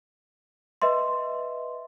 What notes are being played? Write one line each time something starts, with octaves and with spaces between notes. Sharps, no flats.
B4 D#5 E5 C6